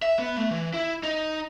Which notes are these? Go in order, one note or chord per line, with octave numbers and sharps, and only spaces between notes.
E5
B3
A3
E3
E4
D#4